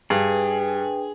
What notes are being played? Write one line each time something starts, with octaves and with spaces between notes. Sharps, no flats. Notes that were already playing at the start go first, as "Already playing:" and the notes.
G2 D4 G#4 B4 G5